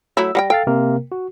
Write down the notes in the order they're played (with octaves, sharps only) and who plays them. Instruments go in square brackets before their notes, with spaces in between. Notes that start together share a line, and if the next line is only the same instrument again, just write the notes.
[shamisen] F#3 A3 E4 [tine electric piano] E6
[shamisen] G3 F#5 G5 [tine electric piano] A#6
[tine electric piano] A4 F5 A6 [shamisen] G5
[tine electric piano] C3 A#3 A#4
F#4